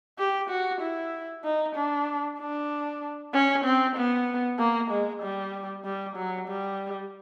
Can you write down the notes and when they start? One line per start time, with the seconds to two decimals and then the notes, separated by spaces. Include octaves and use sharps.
0.19 G4
0.50 F#4
0.81 E4
1.44 D#4
1.75 D4
2.39 D4
3.33 C#4
3.64 C4
3.96 B3
4.59 A#3
4.91 G#3
5.22 G3
5.84 G3
6.16 F#3
6.48 G3